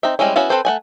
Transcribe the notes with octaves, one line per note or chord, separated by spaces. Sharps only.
C4 D#4 E5
G3 G#3 C4 C#4 E4
B3 C#4 E4 F#4 F5
C4 A4 B4 C5
A3 F#5 G#5